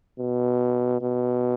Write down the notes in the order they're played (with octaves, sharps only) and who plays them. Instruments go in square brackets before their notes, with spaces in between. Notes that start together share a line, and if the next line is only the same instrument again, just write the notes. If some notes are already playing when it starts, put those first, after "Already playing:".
[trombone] B2
B2